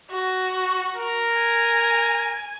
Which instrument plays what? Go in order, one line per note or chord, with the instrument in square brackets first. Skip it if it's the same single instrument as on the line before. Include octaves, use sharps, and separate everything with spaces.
[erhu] F#4
[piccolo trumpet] A#4
[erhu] G#5